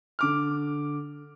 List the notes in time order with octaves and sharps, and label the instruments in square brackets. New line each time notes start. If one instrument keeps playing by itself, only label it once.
[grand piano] D3 D6 F6